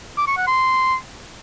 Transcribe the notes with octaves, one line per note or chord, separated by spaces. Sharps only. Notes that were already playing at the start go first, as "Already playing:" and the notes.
D6
C#6
F#5
C6